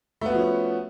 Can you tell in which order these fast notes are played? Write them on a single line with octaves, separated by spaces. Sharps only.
A3 B3 F#4 F3 C#4